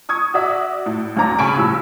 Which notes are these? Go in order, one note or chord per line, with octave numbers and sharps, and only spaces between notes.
C#6 D#6 G#6
F#4 D5 E5 D#6
A2
G#1 D2 C#4 D4 A#5 D6
C#3 G#5 A5 B5 C#6 D7
A#1 A2 G3 E6